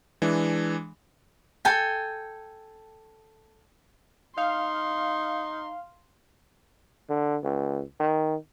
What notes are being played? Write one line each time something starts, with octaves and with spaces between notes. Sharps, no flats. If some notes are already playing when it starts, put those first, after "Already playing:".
E3 G#3 D4
A4 G5 G#5
D#4 F5 C6
D3
C#2
D#3